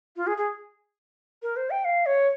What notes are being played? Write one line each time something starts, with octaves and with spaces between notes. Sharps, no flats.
F4
G#4
G#4
A#4
C5
G5
F5
C#5